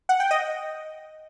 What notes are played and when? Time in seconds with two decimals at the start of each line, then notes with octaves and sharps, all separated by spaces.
0.09 F#5
0.20 G5
0.31 D#5